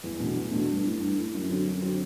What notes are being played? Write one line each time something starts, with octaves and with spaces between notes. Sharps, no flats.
E2
B2 A3 D4 F#4
E2
B2 A3 D4 F#4
G2
E3 A3
G2
E3 A3
F#2
D3 F#3 C4
F#2
D3 F#3 C4